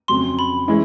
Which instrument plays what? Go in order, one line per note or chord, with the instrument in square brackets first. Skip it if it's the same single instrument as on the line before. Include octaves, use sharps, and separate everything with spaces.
[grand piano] F2 C#3 F#3 [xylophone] C6
[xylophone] B5
[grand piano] E3 G#3 C#4 E4 G#4